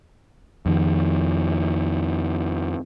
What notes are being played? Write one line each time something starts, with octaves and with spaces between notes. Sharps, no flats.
F2 D#3